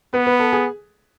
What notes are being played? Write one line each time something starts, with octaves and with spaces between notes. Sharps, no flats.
B3 B4
B4
A4
G#4